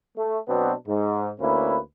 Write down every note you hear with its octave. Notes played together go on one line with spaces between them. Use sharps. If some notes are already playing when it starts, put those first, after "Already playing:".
A3
B2 F#3 B3 C4 D4
G#2
D2 A#3 C#4 E4 B4